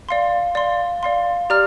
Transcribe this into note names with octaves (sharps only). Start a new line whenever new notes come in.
D5 F5 C6
D5 F5 C6
D5 F5 C6
G4 D5 A#5 F6